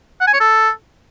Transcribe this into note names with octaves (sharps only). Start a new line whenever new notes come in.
F#5
G#5
C#5
A4